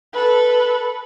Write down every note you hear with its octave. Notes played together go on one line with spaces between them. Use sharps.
A4 B4